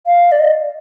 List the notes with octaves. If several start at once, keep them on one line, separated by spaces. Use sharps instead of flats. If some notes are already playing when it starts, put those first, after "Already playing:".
F5
D5
D#5